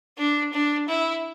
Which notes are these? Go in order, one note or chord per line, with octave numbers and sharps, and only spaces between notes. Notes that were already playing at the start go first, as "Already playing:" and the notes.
D4
D4
E4